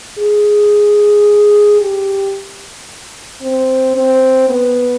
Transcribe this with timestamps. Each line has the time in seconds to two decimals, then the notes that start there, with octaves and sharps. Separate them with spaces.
0.18 G#4
1.81 G4
3.42 C4
3.95 C4
4.49 B3